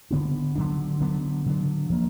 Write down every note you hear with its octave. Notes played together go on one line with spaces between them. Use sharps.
D3 F#3 B3 D4
D3 F#3 B3 D4
D3 F#3 B3 D4
D3 F#3 B3 D4
F3 A#3